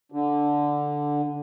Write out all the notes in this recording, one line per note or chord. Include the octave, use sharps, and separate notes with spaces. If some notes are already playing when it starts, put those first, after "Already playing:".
D3